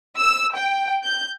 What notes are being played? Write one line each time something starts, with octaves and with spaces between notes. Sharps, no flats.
E6
G5
G6